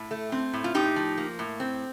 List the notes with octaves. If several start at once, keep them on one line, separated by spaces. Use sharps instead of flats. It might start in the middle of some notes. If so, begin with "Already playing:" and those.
Already playing: A2
A3
C4
A2
F4
A2 D#4 G4
F3
A#3
A2
C4